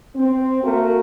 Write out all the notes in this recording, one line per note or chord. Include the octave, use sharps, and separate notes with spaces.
C4
A3 A#3 F#4 A#4